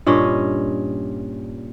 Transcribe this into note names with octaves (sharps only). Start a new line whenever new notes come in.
G2 A#2 C#4 D#5